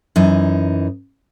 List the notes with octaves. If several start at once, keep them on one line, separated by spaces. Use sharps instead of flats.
F#2 E3 D#4